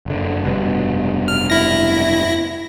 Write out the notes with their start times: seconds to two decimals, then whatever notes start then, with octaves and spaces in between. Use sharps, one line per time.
0.06 F#1 D3
0.44 F1 G2 B2
1.28 F6
1.50 E4 A#6